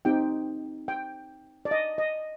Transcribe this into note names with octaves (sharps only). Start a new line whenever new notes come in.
C4 D#4 G4 G5
G5
D5
D#5
D#5